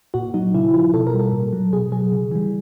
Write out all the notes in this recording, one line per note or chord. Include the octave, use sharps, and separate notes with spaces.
A#2 F#4
F#3 D#4
C#3 E4
F3 F4
B2 A4
A#4
G3
A4
A#2
F#3
B2 G#4
F#3 G#4
C#3
E3 G3